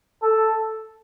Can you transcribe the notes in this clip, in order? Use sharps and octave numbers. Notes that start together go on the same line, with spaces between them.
A4